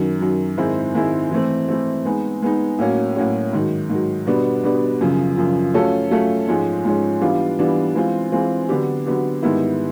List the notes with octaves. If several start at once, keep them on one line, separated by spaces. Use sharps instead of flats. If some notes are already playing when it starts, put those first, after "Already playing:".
Already playing: F#2 D#3 F#3
F#2 D#3 F#3
G#2 D#3 G#3 C4 E4
G#2 D#3 G#3 C4 E4
E3 A3 C4
E3 A3 C4
G#3 B3 D#4
G#3 B3 D#4
A2 F#3 A#3 C#4 F#4
A2 F#3 A#3 C#4 F#4
G#2 D#3 F#3
G#2 D#3 F#3
B2 G3 B3 D4
B2 G3 B3 D4
F#2 C#3 F3
F#2 C#3 F3
F#3 A3 C#4 F4 A4
F#3 A3 C#4 F4 A4
G#2 F3 G#3 C#4
G#2 F3 G#3 C#4
E3 G3 B3 D4 F4
E3 G3 B3 D4 F4
E3 G#3 C4 F4
E3 G#3 C4 F4
D3 F#3 B3 D4 G4
D3 F#3 B3 D4 G4
G#2 D#3 G3 B3 E4